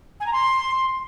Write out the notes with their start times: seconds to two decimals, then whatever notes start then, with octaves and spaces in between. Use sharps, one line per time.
0.20 G#5
0.26 A#5
0.33 C6